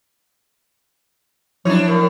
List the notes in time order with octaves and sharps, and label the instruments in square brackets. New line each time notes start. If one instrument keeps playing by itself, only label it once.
[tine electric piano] F3 E4 [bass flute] F#3 [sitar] D4 F#4 C#5
[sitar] A2 [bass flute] A#4